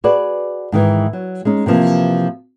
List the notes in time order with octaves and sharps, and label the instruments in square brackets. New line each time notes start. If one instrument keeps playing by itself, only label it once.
[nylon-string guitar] F#4 G#4 B4 D5
G#2 D#3 E3
F#3
G#3 C#4 D#4
C3 E3 F3 A#3